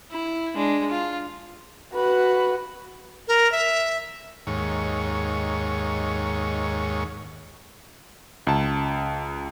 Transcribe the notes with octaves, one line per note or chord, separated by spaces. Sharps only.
E4
G#3 D4
F4
F#4 B4
A#4
E5
D#2 G#2 C#5
C#2 A5